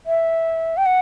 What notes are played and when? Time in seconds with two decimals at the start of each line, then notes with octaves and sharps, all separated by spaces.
0.06 E5
0.77 G5
0.86 F#5